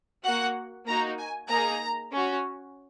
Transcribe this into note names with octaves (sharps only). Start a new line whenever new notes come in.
A#3 F#4 F#5
A#3 D#4 F#4 A#5
G#5
A#3 D#4 G#4 A#5
C#4 F#4